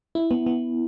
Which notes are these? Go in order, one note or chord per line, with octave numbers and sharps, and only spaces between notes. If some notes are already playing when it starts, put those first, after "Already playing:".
E4
B3
B3